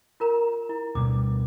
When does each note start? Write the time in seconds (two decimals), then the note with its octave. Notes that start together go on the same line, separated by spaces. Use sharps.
0.20 F4 A#4 A#5
0.69 E4
0.95 D2 B2 G3 D6